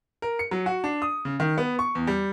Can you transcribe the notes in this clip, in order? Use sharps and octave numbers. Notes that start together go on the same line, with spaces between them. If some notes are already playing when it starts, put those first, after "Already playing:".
A#4
C#7
F#3
F#4
D4
D#6
C#3
D#3
B3
C#6
E2
G3